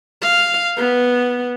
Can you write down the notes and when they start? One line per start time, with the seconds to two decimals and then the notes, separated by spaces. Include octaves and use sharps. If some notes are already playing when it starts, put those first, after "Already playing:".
0.22 F5
0.77 B3